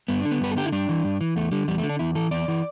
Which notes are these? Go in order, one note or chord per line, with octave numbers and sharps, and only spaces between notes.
G2 B3
D4
D3
B3
G2 B4
A4
D3 G4
E4
G2 D4
E3
G2
E3
E2 A3
D3 G3
E2 G3
A3
D3
D4
E2 E4
E3 A4
E2 D5
E3